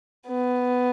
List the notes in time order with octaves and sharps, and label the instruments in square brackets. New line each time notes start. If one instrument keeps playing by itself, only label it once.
[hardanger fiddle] B3